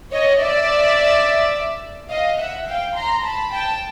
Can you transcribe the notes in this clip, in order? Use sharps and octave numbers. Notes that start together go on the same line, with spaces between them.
C#5 D#5
D5 E5
D#5 F5
E5 F#5
F5 G5
A#5 C6
A5 B5
G5 A5